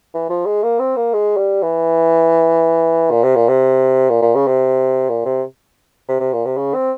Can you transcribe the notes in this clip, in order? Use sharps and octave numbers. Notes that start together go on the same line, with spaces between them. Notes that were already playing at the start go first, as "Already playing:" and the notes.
E3
F3
G#3
A#3
C4
A#3
G#3
G3
E3
A#2
C3
A#2
C3
A#2
A#2
C#3
C3
A#2
C3
C3
C3
A#2
C3
C#3
C4